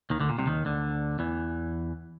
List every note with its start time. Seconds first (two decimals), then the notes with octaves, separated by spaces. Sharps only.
0.10 D#2 D#3
0.20 D2 D3
0.29 A#2
0.38 C2 C3
0.46 D#2 D#3
0.65 D2 D3
1.19 E2 E3